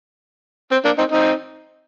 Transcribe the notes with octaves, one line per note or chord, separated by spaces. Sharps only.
C4
A#3 D4
C4 D#4
C4 D#4